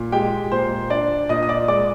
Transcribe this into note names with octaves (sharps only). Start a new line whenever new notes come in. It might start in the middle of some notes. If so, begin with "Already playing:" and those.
Already playing: A#2
G#3 G4 G5
A#2 C5 C6
D4 D5 D6
A#2 D#5 D#6
D#6
D5 D6
G#3 D5 D6